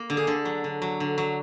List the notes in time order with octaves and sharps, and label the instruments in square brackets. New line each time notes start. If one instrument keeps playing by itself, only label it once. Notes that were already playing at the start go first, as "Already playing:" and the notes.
Already playing: [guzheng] A#3 A#4
D3
G#4
D3 A4
F#3
D3
F#3
D3
F#3